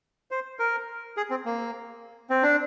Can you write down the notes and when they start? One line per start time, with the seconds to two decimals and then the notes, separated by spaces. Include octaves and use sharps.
0.31 C5
0.59 A#4
1.17 G#4
1.30 C4
1.45 A#3
2.30 C4
2.43 D4